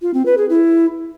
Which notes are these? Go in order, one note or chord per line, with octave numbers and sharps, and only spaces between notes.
F4
C4
B4
G#4
E4